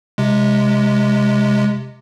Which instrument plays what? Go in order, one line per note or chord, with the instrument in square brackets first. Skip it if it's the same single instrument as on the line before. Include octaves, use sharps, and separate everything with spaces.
[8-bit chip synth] C3 G#3